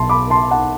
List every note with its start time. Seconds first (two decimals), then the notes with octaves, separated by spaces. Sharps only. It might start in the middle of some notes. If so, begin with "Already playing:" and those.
Already playing: B1 B2 A5 C6
0.09 B5 D6
0.30 A5 C6
0.51 F#5 A5